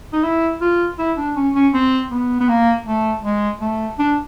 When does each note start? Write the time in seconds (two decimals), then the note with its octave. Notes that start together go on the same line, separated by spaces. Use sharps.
0.13 D#4
0.24 E4
0.61 F4
0.99 E4
1.17 D4
1.36 C#4
1.55 C#4
1.74 C4
2.11 B3
2.41 B3
2.49 A#3
2.86 A3
3.24 G#3
3.61 A3
3.99 D4